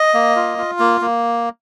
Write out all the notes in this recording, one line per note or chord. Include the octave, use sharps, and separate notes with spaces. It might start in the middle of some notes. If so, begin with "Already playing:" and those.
Already playing: D#5
A#3
F4
F4
A#3
A#3